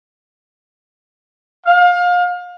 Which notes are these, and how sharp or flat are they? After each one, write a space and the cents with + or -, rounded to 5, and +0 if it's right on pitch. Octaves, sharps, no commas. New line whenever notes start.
F5 +30